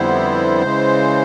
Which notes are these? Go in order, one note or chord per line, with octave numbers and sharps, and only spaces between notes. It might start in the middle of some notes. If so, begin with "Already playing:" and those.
Already playing: F2 D3 G3 B3 E4 C5
C#3 E3 G#3